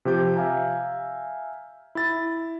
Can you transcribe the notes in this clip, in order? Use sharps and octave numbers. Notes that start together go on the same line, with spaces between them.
C3 F3 G4 G6
E5 F5 G#5 A#5
E4 A6